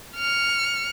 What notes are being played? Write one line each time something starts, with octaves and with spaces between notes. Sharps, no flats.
F6 C#7